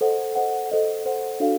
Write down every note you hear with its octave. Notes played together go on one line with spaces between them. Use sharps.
A4 C5 D#5 F#5
A4 C5 D#5 F#5
A4 C5 D#5 F#5
A4 C5 D#5 F#5
D4 F#4 A4 D5 F5